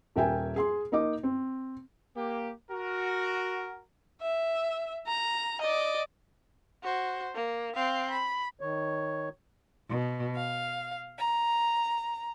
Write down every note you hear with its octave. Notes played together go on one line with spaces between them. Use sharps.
D#1 A#4 E5 G5 G#5
G#4 C6
A#3 D#4 D#5 D6
C4
A#3 G4
F#4 A#4
E5
A#5
D5 D#5
F#4 C5
A#3
C4 F5
B5
D#3 C#5
B2
F5
A#5